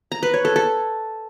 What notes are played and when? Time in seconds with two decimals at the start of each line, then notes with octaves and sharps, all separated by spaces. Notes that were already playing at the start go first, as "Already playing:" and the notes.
0.12 A#5
0.23 B4
0.34 C#5
0.45 A4
0.56 A4